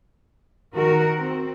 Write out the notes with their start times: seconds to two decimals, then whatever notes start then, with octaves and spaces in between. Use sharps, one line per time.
0.74 D#3 F#4 A#4
1.19 C4